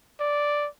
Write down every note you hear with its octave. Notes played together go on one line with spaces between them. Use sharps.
D5